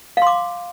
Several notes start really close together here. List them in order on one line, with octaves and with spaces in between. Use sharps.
F5 C6 D6